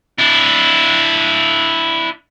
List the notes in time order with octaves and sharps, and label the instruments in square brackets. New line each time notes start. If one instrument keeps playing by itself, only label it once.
[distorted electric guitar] D4 E4